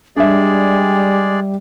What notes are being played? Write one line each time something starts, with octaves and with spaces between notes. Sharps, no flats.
G3 G#3 D4 G#4 D5 E5